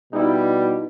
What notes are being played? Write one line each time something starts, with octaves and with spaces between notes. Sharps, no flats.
B2 G3 D#4 E4